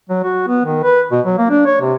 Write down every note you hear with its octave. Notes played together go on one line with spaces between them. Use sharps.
F#3
F#4
B3
D#3
B4
B2
F#3
A#3
D4
C#5
C3